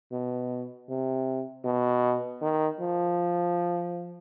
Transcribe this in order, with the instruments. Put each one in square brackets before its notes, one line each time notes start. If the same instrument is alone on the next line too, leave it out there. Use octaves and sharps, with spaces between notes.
[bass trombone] B2
C3
B2
D#3
F3